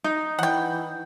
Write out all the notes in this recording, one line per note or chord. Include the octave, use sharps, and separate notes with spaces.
D#4
E3 F#5 G5